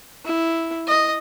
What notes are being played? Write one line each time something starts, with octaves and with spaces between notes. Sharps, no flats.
E4
D#5